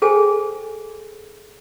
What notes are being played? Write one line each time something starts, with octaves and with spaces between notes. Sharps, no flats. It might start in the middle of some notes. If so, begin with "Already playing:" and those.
G#4 A4 C5 G5 G#5